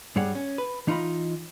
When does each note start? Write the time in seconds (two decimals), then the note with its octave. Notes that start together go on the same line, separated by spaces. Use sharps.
0.16 G2 G3 G#4 C#5 F#5
0.35 C#4
0.58 B4
0.87 E3 D#4 F4 D#5 B5